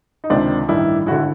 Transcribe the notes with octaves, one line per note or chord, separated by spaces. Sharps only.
D#4
C#2 C3 D#3 C4 D4
A1 G2 D#3 D4 E4
G#1 D3 E4 F#4